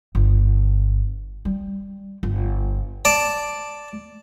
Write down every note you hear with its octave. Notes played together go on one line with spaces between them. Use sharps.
G1
G3
G1
D5 A5